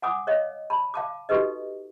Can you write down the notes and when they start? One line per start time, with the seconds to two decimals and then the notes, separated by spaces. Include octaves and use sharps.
0.02 F#5 G#5 D6 D#6
0.27 C#5 D#5 F5
0.70 A5 B5
0.94 F5 A5 D6
1.29 D#4 F#4 G4 A4 B4 D#5